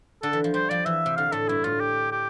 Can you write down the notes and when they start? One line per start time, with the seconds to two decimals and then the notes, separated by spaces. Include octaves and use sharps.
0.23 D3 A4
0.33 E3
0.44 F3
0.54 G3 C5
0.70 F3 D5
0.86 E3 E5
1.06 C3
1.17 D3 F5
1.32 A2 A4
1.48 G2 E4
1.64 A2 F4
1.81 G4
2.11 G4